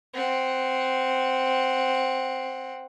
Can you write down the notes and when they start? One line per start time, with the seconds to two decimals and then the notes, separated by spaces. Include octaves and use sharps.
0.13 C4 F#5